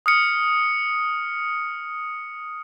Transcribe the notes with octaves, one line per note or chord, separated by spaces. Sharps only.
D#6 F6 C#7